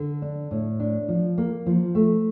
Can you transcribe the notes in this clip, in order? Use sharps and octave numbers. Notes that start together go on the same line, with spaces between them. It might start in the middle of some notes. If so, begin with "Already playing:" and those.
Already playing: D3
D4
A2
D4
F3
A#3
F3
A3